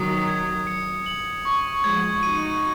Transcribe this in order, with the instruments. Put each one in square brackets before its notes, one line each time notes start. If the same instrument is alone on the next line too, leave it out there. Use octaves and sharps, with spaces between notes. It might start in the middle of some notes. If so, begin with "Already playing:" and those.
Already playing: [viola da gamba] D#3 F#3 [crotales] D#6
[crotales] G#6
C#7
F#7
C#6
[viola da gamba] F3 G#3 [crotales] G#6
[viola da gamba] D#4 F#4 [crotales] D#7